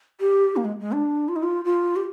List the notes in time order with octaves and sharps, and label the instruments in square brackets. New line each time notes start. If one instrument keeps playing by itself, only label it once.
[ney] G4
A#3
G#3
G#3
D4
F4
D#4
F4
F4
G4